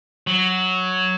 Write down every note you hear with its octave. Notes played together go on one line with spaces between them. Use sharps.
F#3